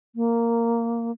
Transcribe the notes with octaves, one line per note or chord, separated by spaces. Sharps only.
A#3